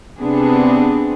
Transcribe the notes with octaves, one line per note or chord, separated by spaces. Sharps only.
C3 B3 C4 D4 G#4